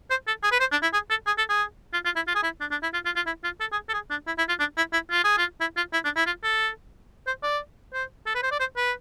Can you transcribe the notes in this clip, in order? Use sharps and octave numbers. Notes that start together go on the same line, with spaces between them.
C5
A4
G#4
B4
C5
D4
E4
G#4
A4
G#4
A4
G#4
F4
F4
E4
F4
G#4
E4
D4
D4
E4
F4
F4
F4
E4
F4
A4
G#4
A4
G#4
D4
E4
E4
F4
D4
E4
E4
F4
G#4
F4
E4
F4
E4
D4
E4
F4
A4
C5
D5
C5
A4
B4
C5
D5
C5
B4